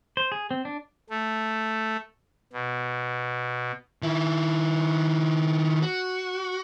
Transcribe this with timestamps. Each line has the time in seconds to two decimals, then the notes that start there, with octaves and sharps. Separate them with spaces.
0.17 C5
0.32 G#4
0.51 C4
0.65 D4
1.10 A3
2.53 B2
4.02 D#3 E4
5.82 F#4